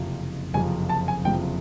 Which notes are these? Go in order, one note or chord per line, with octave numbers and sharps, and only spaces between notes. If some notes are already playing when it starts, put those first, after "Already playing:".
Already playing: F#1 F2 C3 F3
F#1 F2 C3 F3 G#5
A5
G#5
F#1 F2 C3 F3 G5